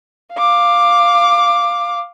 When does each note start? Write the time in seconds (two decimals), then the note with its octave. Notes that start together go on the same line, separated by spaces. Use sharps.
0.34 F5 D6